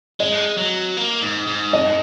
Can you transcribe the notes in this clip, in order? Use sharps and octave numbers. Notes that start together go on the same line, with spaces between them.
G#3 D#5
F#3
A#3
G#2
G#2
D#5